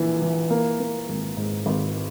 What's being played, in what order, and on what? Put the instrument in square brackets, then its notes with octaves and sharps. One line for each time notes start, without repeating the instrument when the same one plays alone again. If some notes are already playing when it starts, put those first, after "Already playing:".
Already playing: [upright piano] A#1 E3 A#3
E3
A#3
A#3
G#1
G#2
G#1